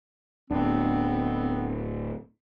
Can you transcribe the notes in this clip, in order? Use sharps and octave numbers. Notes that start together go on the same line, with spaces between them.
D1 B3 C4 D4